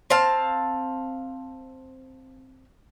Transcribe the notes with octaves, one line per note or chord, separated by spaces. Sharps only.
C4 F5 A5